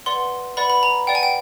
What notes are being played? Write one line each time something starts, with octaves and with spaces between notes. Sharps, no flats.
B4 D5 F#5 C6
B4 D5 F#5 B5
B5
A#5
B4 D5 F#5 G5
G#5
G5